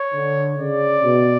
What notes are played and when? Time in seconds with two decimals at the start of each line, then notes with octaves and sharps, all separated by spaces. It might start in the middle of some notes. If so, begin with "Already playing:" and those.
Already playing: C#5
0.14 D3
0.59 C#3 D5
1.03 B2